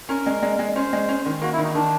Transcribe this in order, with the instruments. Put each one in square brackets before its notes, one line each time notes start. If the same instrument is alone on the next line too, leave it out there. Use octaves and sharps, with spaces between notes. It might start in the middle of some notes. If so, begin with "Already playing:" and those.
[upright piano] C#4 [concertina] A#4
[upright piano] G#3
G#3
G#3
[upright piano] C#4 [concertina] C5
[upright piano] G#3
C#4
D#3
[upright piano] A#3 [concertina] F#4
[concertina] E4
[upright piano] D#3
[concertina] D#4
[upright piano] D#3 [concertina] D4